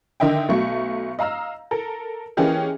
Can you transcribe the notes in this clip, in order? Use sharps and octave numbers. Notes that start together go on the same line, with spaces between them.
D3 D#3 D#5 E5 G5
B1 F#3 A3 C#6
D#5 F5 A#5 E6 F6
A4 A#4
E3 A#3 C#4 G4 G#4 D#5